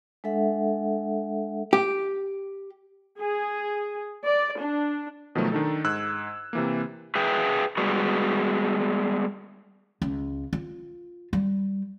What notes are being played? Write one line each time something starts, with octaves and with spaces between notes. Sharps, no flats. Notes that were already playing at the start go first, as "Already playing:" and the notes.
G#3 D4 A4 E5 F#5
G4
G#4
D5
D4
B2 D#3 F3 F#3 A3
D#3 D4 D#4 A4
G#2 E6 F#6 G#6
C3 E3 A#3
G#4 B4 E5 G5 G#5
G3 G#3 B3 F#4
C#2
F4
G3